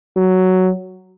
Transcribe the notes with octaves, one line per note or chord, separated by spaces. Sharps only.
F#3